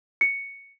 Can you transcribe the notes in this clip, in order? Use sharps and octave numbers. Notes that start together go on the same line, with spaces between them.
C#7